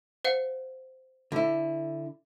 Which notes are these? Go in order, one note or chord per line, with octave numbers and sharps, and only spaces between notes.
C5 F5 F#5
D3 E4